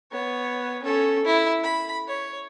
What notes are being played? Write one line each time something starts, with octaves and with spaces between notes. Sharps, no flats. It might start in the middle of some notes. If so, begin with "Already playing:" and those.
B3 C#5
C#4 A4
E4
B5
C#5